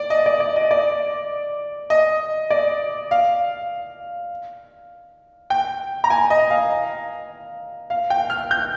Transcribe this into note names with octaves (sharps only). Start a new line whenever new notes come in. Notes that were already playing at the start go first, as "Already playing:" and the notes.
Already playing: D5
D#5
D5
D5
D#5
D5
D#5
D5
F5
G5
A#5
G#5
D#5
F5
F5
G5
F6
G6